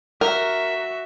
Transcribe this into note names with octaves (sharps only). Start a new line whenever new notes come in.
F#4 A#4 E5